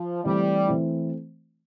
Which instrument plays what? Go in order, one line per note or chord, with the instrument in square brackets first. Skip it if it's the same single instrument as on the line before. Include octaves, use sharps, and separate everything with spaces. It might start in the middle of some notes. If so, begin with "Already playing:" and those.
Already playing: [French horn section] F3
[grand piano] E3 A3 C4 E4 [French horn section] G3
[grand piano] E3 A3 C4 E4